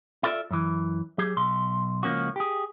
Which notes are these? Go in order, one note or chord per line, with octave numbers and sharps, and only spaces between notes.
E4 F4 A4 B4 D5 E5
F#2 E3
F#3 G4 G#4
B1 C6
C#2 F3 A#3 C#4 F#4
G4 G#4